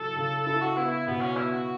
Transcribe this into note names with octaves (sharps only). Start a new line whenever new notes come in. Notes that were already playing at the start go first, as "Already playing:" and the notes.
Already playing: C#3 F#3 E4 A4
C#3
E4 A4
F#4
B3 E4
E4
B2 B3
C#4
B3 E4
F#4